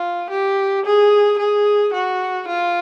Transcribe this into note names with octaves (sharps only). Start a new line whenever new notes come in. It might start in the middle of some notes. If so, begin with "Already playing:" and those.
Already playing: F4
G4
G#4
G#4
F#4
F4